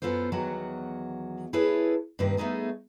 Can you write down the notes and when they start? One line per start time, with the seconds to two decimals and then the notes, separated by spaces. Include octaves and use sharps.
0.02 F#2 B3 F4 A4 C5
0.32 E2 D#3 F#3 F#4 A5
1.53 E4 G#4 A4 B4 C#5
2.19 G2 C3 D#3 A#3 B4
2.37 A3 B3 D#4 G#4 A4